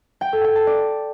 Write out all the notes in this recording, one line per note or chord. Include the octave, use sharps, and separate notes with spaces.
G5
A4
G5
A5
D5